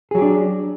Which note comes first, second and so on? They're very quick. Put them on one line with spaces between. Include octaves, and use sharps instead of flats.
G#4 F#3 G4 D4